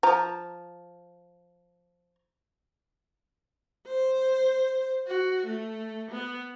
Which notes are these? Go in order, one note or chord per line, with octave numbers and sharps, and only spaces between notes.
F3 A#5
C5
F#4
A3
B3